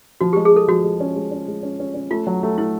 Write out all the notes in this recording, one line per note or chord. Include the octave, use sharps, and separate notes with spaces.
F3 F#4
G#3 G4
G#4
G#3 A4
F3 F#4
G#3
C#4
G#3
C#4
G#3
C#4
C#4
C#4
A3 F4
F#3
A3
A3 E4